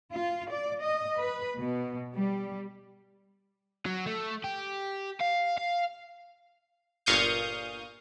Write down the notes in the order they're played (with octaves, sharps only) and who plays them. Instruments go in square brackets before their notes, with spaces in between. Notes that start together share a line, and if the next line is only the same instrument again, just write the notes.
[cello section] F4
D5
D#5
B4
B2
G3
[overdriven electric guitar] F#3
A3
G4
F5
F5
[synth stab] G1 A#2 F5 C#6 D#6 G6